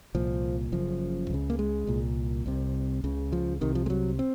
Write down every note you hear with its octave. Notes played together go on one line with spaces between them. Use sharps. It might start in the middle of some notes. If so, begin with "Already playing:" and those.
C2 A#2 F3
F#1 F#2 C#3 F3
C#2 C#3
A#3
G#3
C2 A#2
C2 C3
C#2 C#3
F3
C2 C3 D#3
F3
G#3
F#3
C4